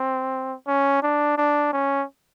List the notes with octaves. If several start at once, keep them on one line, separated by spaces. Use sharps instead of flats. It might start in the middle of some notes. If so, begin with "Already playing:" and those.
Already playing: C4
C#4
D4
D4
C#4